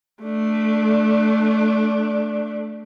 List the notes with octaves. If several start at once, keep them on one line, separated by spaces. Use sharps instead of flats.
A3 D4